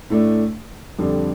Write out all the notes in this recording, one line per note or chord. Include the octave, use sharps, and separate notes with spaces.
A2 A3 D4
F2 D3 G3 D4